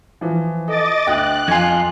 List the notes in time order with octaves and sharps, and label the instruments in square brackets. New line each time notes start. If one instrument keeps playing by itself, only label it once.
[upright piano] E3 F3
[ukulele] A4 [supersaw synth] D#5 D6 A6
[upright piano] D2 [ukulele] G5 [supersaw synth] F#6
[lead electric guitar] F2 F4 [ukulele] D#5 G#5 [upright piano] G#6 C7